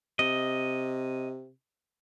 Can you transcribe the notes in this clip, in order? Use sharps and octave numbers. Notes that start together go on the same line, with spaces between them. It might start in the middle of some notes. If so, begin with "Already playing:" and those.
C3 D#5